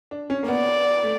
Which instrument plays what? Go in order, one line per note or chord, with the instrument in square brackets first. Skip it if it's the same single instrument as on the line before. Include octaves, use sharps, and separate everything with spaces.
[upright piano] D4
C#4
A#3
[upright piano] B3 [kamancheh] D5
[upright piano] A3